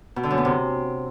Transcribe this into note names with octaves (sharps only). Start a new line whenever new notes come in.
B2
D3
F#2
B3
C3